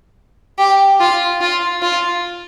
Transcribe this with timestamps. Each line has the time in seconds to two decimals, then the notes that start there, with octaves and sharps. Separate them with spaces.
0.59 G4
1.00 F4
1.41 F4
1.82 F4